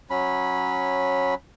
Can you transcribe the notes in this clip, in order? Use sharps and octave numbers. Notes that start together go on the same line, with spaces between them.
F#3 C#4 B5